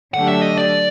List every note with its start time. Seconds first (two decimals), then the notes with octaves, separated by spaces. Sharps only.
0.14 D3 F#3 A3 D4 G4 F#5
0.28 E5
0.42 D#5
0.57 D5